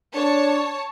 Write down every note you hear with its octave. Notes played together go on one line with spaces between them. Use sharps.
D4 C#5 A5